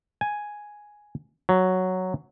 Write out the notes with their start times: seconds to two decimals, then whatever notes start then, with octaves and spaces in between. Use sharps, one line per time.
0.21 G#5
1.49 F#3